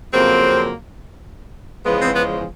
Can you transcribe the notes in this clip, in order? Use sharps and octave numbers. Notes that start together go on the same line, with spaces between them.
F2 C#3 F#3 A#3 C4
E2 C#3 F3 G#3 B3
C4
B3